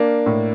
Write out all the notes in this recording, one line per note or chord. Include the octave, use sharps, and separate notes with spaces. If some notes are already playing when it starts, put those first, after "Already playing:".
Already playing: A#3 D4
A2